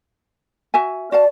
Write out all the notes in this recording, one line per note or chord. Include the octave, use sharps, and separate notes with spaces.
F#4 E5 G#5
F#4 D5 F5 A5